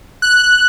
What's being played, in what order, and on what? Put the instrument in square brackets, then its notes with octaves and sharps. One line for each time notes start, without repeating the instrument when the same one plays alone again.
[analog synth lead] F#6